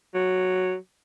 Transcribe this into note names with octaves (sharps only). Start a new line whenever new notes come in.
F#3